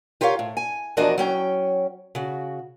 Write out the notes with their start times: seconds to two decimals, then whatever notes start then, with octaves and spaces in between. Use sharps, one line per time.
0.21 F4 G4 A#4 C#5 F5
0.39 A2
0.57 G#5
0.97 E2 F3 D4 F#4 A#4 D#5
1.18 F#3 C#4 G5
2.15 C#3 F#4